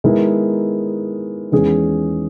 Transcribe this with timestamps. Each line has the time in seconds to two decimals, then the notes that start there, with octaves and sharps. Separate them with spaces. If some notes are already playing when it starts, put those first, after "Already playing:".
0.04 D#3 G#3 B3 E4 A#4
1.52 E2 D#3 G#3 C#4 G#4